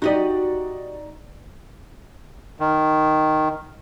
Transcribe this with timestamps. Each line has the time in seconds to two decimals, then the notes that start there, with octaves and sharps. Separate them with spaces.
0.02 D#4 F#4 G4 D5 D#5
2.60 D#3